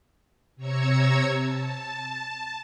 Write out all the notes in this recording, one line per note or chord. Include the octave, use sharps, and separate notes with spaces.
C3 C#5 A#5 E6 G#6 C#7
A5